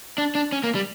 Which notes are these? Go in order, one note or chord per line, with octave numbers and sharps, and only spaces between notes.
D4
D4
C#4
A#3
G3